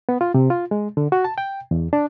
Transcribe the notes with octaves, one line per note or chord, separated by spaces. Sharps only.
B3
F4
C3
F4
G#3
D3
F#4
A5
G5
E2
D4